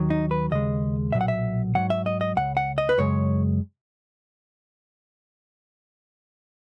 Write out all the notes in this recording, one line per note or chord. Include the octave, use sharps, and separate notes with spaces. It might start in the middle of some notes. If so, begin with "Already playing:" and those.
Already playing: D#2 D#3 F#3
D#4
B4
D#2 C#3 G#3 D#5
B1 A#2 F#3 E5
F#5
E5
G#2 D#3 F#3 F#5
E5
D#5
D#5
C#2 C#3 F#5
F#5
D#5
B4
F#2 C#3 G#3 C#5